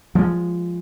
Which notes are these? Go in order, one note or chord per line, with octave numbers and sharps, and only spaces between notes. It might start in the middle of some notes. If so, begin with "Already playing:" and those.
F3 G#3